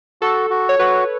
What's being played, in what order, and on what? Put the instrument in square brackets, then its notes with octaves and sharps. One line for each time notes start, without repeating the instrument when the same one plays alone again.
[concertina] F#4 [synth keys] A4
[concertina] F#4
[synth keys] C#5
[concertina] F#4 [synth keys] B4